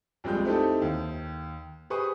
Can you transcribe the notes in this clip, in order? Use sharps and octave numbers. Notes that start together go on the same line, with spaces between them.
A#1 F2 G3 G#3 G5 G6
A3 C4 D#4 E4 G4 A4
D#2
G4 G#4 B4 C5 C#6 D#6